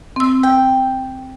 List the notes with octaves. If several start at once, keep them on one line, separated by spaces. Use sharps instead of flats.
C4 E6
G5